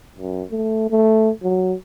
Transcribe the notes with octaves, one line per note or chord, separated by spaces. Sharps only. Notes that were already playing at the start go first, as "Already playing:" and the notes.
F#2
A3
A3
F#3